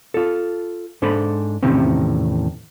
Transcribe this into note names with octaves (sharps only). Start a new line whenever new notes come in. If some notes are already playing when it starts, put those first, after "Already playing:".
F4 A4
G#2 D4 A4 C5 B5
E2 A2 C3 D#3 C4 C#4